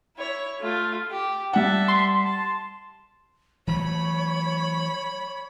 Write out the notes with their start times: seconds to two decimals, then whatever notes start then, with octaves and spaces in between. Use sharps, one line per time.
0.17 E4 C#5
0.60 A3 F4
1.11 G4
1.53 G3 E5 F#5 A5
1.88 C6
2.25 A5
3.67 E3 F#3 A3 C#5 B5